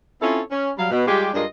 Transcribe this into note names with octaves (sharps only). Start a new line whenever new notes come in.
C4 C#4 E4 F4 A4 C#5
C#4
F#3 G3 F5
B2
G3 G#3 F4 G4
G2 G#3 D4 F4 A#4 D#5